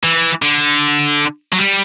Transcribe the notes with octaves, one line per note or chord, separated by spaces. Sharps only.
E3
D3
F#3
G3